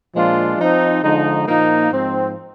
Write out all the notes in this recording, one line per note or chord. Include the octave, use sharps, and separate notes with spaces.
A#2 F3 G#3 D4 F4
F3 C4 D#4
D3 F3 G#3 D#4
A#2 F3 A#3 D#4
G#2 F3 C4